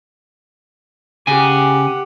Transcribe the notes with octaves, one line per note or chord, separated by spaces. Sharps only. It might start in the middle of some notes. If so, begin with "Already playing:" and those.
C#3 G4 F#5 G#5